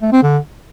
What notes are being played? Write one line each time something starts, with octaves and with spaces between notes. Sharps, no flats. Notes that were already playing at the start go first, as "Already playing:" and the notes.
A3
C4
D3